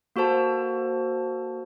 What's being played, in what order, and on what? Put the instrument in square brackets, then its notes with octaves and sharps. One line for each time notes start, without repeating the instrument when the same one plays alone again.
[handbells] A#3 F#4 A4 C5 A5